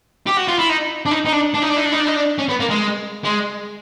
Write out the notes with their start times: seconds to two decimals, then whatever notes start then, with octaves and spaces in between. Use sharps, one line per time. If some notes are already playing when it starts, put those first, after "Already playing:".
0.27 G4
0.37 F#4
0.48 F4
0.59 E4
0.69 D#4
1.06 D4
1.11 D#4
1.25 D#4
1.32 D4
1.54 D4
1.62 D#4
1.69 D4
1.77 D#4
1.85 D4
1.92 D#4
2.00 D4
2.07 D#4
2.15 D4
2.39 C#4
2.50 B3
2.61 A#3
2.70 G#3
3.25 G#3